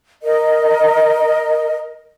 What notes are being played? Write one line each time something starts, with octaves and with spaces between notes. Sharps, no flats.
A#4 D#5